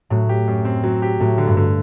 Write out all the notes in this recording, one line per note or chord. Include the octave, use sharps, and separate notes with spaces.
A2 F#3
G4
F#2
C4
F#3
G4
A2 F#3
D3
G2
D3